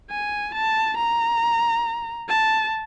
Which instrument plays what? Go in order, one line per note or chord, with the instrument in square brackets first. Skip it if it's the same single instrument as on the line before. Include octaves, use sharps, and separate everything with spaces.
[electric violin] G#5
A5
A#5
A5